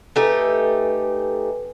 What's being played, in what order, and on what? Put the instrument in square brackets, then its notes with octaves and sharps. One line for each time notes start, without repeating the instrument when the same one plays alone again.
[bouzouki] A3 D#4 G4 [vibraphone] A4 B4 G#5